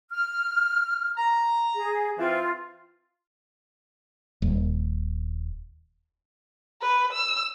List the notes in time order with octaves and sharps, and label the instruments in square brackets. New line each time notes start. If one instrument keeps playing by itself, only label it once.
[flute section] F6
[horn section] A#5
[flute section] G#4
[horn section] E3 C4 [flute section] F4
[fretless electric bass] D#1
[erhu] B4
E6